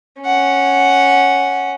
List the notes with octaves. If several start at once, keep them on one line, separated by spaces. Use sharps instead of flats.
C#4 F#5